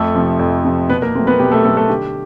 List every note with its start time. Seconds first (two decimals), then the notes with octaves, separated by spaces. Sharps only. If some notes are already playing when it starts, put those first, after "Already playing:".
Already playing: F2 A3 A4
0.14 C3 F3
0.39 F2
0.65 C3 F3
0.89 B2 B3 B4
1.02 A#3 A#4
1.15 F#3 A3 C4
1.27 B3 B4
1.39 B2 G4
1.52 A3 A4
1.64 F#3 A3 C4 A4
1.77 A3 A4
1.89 D3 G4